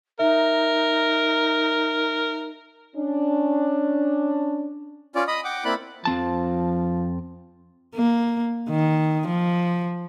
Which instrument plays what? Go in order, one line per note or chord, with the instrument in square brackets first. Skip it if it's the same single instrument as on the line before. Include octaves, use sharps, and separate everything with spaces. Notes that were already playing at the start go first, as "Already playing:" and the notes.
[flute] D#4 [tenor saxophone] A#4 [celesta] E5
[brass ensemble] C#4 D4
[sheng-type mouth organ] C#4 F4 D5
D#5 B5 D#6
F#5 G5 D6
A#3 C4 E4 D5 B5 F#6
[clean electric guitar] F2 C4 A5 [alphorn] F3
[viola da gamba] A#3
D#3
F3